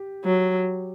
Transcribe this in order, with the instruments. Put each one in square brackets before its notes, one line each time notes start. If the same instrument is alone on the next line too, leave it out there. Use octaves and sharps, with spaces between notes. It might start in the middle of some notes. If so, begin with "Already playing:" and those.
Already playing: [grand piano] G4
[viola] F#3